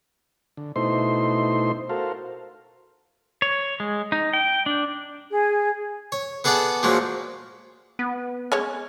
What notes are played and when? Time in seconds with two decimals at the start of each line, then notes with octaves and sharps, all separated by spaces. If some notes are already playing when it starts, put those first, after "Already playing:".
0.57 D3
0.76 B2 A3 D#4 E4 C5 C6
1.89 F#4 A4 A#4 C5 F5
3.42 C#5
3.80 G#3
4.12 D#4
4.33 G5
4.66 D4
5.31 G#4
6.12 C#5
6.44 B3 G#4 A4 D5 F#5 A5
6.83 A#2 F3 F#3 G#3
7.99 B3
8.52 G#3 C#4 C#5